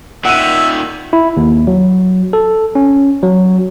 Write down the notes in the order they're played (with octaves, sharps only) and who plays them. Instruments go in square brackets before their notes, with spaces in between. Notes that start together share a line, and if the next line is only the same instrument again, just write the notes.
[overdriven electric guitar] A#2 D#3 [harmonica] E5 [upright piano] F#5 D#7
[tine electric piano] E4
D#2
F#3
A4
C#4
F#3